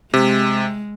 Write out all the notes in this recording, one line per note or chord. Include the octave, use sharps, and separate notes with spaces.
C3 G#3